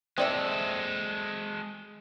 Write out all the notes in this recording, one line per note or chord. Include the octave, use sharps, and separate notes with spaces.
G#3 C4 A4 D5 E5